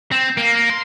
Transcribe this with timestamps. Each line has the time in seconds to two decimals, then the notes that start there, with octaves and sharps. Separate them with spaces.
0.12 C4
0.37 A#3
0.70 C6